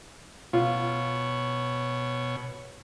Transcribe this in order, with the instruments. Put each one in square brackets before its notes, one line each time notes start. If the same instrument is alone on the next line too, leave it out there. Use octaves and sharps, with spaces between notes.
[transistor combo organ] B2 C#5 [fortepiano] F4